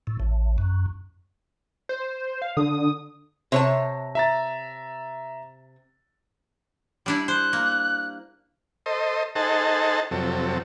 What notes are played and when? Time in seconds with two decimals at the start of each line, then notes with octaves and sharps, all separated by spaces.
0.07 A2
0.20 A1
0.58 F#2
1.89 C5
2.42 F5
2.57 D3 D#6
3.52 C3 C5 C#5 A5
4.15 E5 A#5 A6
7.06 G3 D4 E4 B5
7.28 C5 F#6
7.53 A#3
8.86 A4 C5 D#5
9.35 D#4 G#4 A4 C5 F#5 A5
10.11 F2 C3 F#3 A4